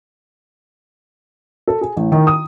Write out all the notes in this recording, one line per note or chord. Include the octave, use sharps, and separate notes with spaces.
A4
G#4
A1
D#3
D#6